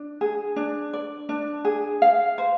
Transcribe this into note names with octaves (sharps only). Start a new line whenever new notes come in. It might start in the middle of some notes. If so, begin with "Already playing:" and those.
Already playing: D4
G#4
D4
D5
D4
G#4
F5
C5